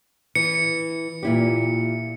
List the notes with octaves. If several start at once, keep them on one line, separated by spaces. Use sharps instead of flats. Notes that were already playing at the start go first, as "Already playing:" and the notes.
E3 C#7
A#2 E4 G4